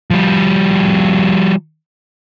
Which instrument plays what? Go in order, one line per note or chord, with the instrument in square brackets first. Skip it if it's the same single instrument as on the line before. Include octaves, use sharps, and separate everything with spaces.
[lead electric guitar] F3 G3